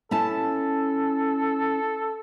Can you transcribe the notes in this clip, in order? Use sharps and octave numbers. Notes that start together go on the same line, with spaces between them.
C#4 E4 A4 A5